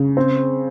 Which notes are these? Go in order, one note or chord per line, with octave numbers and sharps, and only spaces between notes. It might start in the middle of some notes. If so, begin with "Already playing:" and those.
Already playing: C#3
C4